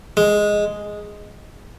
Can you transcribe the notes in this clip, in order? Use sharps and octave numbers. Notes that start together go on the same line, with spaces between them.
G#3